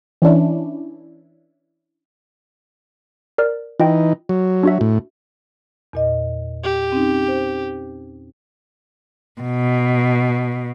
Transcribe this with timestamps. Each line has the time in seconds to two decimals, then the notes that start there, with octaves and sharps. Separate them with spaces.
0.22 E3 C#4 D4 E4
3.38 A#4 D5 F6
3.80 E3 D#4 F4 D#5 G5
4.29 F#3
4.63 D4 F#4 E5
4.81 A2
5.93 E2 A#2 D#5
6.64 G4
6.92 C4 C#4 D#4
7.28 C5
9.41 B2